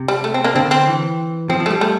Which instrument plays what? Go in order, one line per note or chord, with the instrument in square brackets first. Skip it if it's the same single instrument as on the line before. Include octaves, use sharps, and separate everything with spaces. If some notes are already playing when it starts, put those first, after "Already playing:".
Already playing: [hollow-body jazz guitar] C3
[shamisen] G3
A3
C4
A#3 D4
[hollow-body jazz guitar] D3 [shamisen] C4
[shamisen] C4
[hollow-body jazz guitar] E3
[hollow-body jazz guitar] F3 [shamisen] C4
[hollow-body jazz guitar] F3
[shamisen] A3
[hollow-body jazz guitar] G3
[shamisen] A3